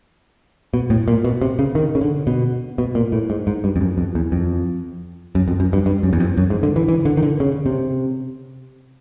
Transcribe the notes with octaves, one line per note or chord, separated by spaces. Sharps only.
B2
A2
A#2
B2
C3
C#3
D#3
C#3
D3
B2
B2
A#2
A2
G#2
G#2
G2
F2
F#2
F2
E2
F2
F#2
F2
F#2
G2
G2
F#2
E2
F2
F#2
G#2
D3
E3
E3
D3
D#3
D3
C#3
C3